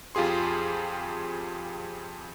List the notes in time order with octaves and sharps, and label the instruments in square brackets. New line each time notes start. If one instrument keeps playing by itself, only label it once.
[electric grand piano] F2 F4 G4 G#4 C6